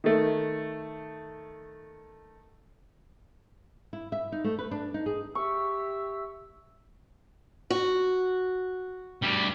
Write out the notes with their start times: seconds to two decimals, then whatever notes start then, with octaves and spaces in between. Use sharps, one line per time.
0.04 D#3 A3
3.93 E4
4.12 E5
4.32 D#4
4.44 A3
4.59 B4
4.71 D4
4.94 D#4
5.06 G#4
5.35 G4 E5 C#6 E6
7.70 F#4
9.23 D2 G3